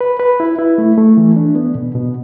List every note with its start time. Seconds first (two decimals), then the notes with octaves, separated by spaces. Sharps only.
0.01 B4
0.20 B4
0.40 E4
0.59 E4
0.78 A3
0.98 A3
1.17 E3
1.36 D4
1.55 B3
1.75 B2
1.95 B2